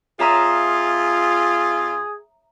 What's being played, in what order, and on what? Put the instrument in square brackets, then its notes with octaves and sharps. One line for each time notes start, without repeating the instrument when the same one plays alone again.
[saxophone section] F2 F4 [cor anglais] G#4 [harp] E5 A#5 D#6